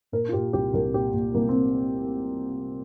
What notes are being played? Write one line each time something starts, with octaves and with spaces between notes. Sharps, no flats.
A#2 A#4
F4
A#2 G4
C2 G4
C2 A#4
A#2 G4
A#2
C2 A#3
C4